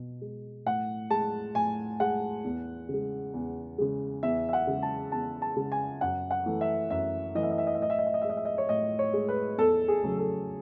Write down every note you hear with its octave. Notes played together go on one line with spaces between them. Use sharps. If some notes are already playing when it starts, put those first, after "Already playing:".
Already playing: B2
G#3
A2 F#5
G#3 A5
A2 G#5
G#3 F#5
E2
C#3 G#3
E2
C#3 G#3
E2 E5
E5
F#5
C#3 G#3
A5
E2 A5
A5
C#3 G#3
G#5
F#2 F#5
F#5
E3 A3
E5
F#2 E5
E3 A3 D#5
E5
D#5
E5
D#5
E5
A2 D#5
E5
D#5
E5
D#5
G#3 E5
D#5
E5
D#5
C#5
A2 D#5
C#5
G#3
B4
E2 A4
G#4
C#3 F#3 A3
A4